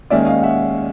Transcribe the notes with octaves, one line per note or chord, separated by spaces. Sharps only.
D#2 D#3 G#3 C#4 D5 E5
D#5 F5
E5 F#5